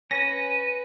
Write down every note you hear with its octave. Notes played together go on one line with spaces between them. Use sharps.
C#4 B4 A#6 D#7